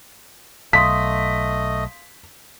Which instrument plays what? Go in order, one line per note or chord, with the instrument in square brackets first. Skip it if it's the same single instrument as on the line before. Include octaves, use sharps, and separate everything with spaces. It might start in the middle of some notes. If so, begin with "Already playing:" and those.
[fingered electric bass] B1 [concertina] A3 D#5 [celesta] F5 C6 D#6 [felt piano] B6